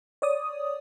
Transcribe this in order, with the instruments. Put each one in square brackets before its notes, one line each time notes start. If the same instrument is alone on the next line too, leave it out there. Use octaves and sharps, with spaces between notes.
[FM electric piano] C#5 D5 D#6